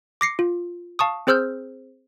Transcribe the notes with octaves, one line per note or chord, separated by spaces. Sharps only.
D6 A#6 C7 C#7
F4
F5 A5 C#6 D#6
C4 G#4 C5 E6 F6 G6